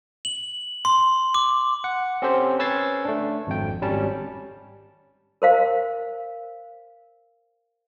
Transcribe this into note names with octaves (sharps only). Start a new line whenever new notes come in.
F#7
C6
D6
F#5
C4 C#4 G4 A4 C5
C#4 B4 E6 G#6 A6 C7
A3 D4
G#1 F2 G5
G#1 G3 C#4 A5
A#4 C5 F5